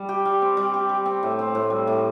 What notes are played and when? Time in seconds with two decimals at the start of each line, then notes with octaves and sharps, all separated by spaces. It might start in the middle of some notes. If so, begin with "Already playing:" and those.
Already playing: G3
0.09 G4
0.25 G3
0.42 C4
0.57 G3
0.74 G4
0.89 G3
1.06 C4
1.23 A2
1.39 C4
1.55 A2
1.70 G3
1.87 A2